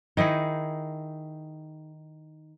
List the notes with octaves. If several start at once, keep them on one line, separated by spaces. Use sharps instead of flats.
D#3 D#4 E4 G#4